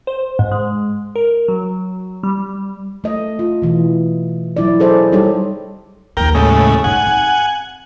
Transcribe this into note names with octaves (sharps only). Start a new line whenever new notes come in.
C5
G#2
G#3
A#4
F#3
G3
A3 D#5
F4
B2 E3
F#3 E4 D5
G#4 A4 C5 D5 D#5
G3 D#4 G4 A4 C#5
D#2 F3 A#4 G5
A2 C#3 G#3
G#2 F#5 G#5
C4